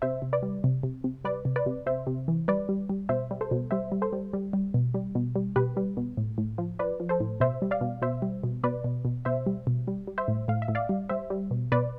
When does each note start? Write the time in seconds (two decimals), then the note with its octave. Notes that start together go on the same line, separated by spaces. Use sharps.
0.02 C3 C5 E5
0.22 C3
0.33 B4 D5
0.42 G3
0.64 C3
0.83 C3
1.04 C3
1.25 G3 B4 D5
1.45 C3
1.56 B4 D5
1.66 C3
1.86 C3 C5 E5
2.07 C3
2.28 E3
2.48 G3 B4 D5
2.69 G3
2.90 G3
3.09 B2 C5 E5
3.31 G3
3.41 A4 C5
3.51 B2
3.71 G3 C5 E5
3.92 G3
4.02 A4 C5
4.13 G3
4.33 G3
4.53 G3
4.74 B2
4.94 G3
5.15 B2
5.36 G3
5.56 B2 G4 B4
5.77 G3
5.97 B2
6.17 A2
6.38 A2
6.58 F3
6.79 F3 B4 D5
7.00 F3
7.09 A4 C5
7.20 A2
7.40 B2 C5 E5
7.62 G3
7.71 D5 F5
7.81 B2
8.02 B2 C5 E5
8.22 G3
8.44 B2
8.64 B2 B4 D5
8.84 B2
9.05 B2
9.25 B2 C5 E5
9.47 G3
9.67 B2
9.88 G3
10.07 G3
10.18 C5 E5
10.28 A2
10.48 A2 F5
10.62 E5
10.68 A2
10.75 D5 F5
10.89 G3
11.09 G3 C5 E5
11.30 G3
11.51 B2
11.72 B2 B4 D5